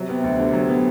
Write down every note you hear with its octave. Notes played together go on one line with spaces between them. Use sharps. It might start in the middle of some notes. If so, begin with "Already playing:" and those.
Already playing: C3 F#3
B3
D2
D3
F#3
B3